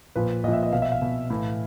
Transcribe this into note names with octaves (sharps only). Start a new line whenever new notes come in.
A#2 F3 B4
A#2 F3 D#5
E5
D#5
B2 F5
E5
F5
B2
A2 E3